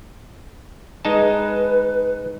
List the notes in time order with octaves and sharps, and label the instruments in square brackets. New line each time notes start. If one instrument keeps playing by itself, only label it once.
[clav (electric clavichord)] G#3 D#4 A5 [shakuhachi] B4